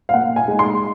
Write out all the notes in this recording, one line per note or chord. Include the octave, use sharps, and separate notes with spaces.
F5
A#2 F#5
G#5
G#3 D#4
C6